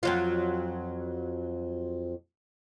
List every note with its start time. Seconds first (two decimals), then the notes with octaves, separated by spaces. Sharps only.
0.03 F2 F#3 F4